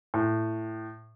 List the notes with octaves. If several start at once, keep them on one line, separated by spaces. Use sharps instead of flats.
A2